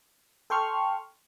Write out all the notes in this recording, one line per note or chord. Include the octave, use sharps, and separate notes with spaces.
A4 G5 C6 C#6 F6